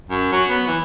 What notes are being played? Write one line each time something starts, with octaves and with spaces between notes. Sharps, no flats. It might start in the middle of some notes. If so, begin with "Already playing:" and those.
F#2
F#3
B3
E3